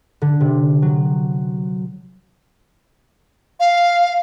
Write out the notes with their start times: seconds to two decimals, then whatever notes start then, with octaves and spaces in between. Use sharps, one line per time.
0.22 D3
0.40 C3
0.82 F#3
3.60 F5